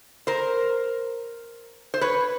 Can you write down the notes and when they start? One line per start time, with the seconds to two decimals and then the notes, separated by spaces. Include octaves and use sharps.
0.27 A#4 C5
1.94 C5
2.01 B4 C#5